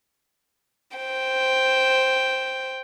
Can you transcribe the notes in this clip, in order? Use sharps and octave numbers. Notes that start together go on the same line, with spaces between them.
C5 G5